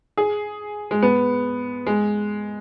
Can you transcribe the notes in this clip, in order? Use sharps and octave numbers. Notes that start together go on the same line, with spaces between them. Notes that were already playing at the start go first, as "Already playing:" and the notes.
G#4
G#3
B3
G#3